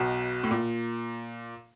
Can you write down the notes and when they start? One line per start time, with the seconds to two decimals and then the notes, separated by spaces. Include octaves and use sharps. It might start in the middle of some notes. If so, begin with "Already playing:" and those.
Already playing: B1 B2
0.44 A2
0.51 A#2